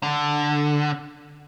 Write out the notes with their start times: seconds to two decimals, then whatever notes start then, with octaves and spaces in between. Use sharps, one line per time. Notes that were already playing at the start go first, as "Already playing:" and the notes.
0.03 D3